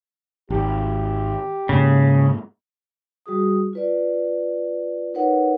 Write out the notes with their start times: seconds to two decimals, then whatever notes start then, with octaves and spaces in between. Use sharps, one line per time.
0.50 G#1 G4
1.69 G#2 C#3 A#3
3.26 G3 F#4 G#4 D#6
3.73 F4 B4 D5
5.14 D#4 A#4 B4 C#5 F#5